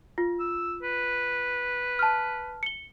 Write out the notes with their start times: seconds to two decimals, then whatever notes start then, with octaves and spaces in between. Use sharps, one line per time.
0.18 F4
0.40 E6
0.82 B4
1.99 A5 F6
2.63 C#7 G7